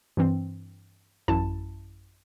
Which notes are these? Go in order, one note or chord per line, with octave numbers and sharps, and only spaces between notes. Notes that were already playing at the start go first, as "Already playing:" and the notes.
G2 E3 C4
A1 F#2 E4 A5